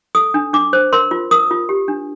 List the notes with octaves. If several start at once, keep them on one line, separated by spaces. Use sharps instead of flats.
A4 D#6
D4
D4 D6
C5
A#4 C6
F4
A#4 D#6
F4
G4
D4